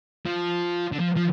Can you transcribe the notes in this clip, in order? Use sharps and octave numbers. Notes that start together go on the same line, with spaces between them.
F3
D3
F3
F3